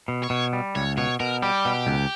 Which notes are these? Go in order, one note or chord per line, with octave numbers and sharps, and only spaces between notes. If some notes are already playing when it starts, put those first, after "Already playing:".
B2
C#5
B2
G3
C#2 C#5
B2 C#5
B2 A#4
G3 G4
B2
C#2